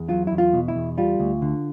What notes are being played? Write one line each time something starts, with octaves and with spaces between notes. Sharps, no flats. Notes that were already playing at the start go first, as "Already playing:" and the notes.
Already playing: E2
F#3 F4
E2 E4
F4
B2
E4
E2
G3 F4
D2
D3